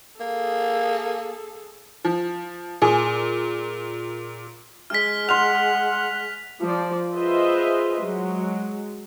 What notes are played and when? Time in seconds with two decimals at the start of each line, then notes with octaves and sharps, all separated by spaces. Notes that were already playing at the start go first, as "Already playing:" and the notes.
0.20 A#3 G#4 A4
2.05 F3
2.82 A#2 G#4
4.90 G#3 F6 B6
5.29 F#5 C6 F6 F7
6.60 F3 C5 D5
7.15 F4 G#4 B4 C5 D#5 E5
8.02 F#3 G#3